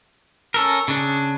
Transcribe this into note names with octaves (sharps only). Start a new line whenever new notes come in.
C#4 A4 A#4
C#3 D4